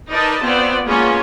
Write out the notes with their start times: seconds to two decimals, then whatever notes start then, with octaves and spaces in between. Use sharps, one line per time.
0.11 D#4 A#4 B4 D5 D#5 A5
0.42 B3 C4 F4 C5 D5
0.85 G#3 A#3 B3 C#4 F4